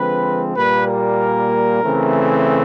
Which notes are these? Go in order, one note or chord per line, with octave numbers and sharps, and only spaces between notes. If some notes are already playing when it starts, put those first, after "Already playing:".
Already playing: D3 F3 G#3 C4 B4
A#2 G3 A#3 B4
A#4
C#3 E3 A3 C4